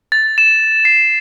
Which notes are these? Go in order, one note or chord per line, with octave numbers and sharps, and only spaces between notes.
A6
E7
C7